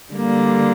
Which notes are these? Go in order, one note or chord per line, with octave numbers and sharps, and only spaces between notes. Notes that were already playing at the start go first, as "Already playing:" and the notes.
D3 G3 A#3